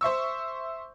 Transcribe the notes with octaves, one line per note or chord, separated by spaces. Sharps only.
C5 E5 C#6 E6